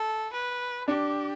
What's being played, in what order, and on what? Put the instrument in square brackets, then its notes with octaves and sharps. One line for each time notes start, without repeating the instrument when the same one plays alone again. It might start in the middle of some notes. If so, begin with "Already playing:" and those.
Already playing: [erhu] A4
B4
[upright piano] D4 [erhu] G4